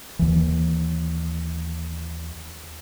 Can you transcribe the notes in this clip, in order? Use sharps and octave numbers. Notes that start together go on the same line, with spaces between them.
D#2 E3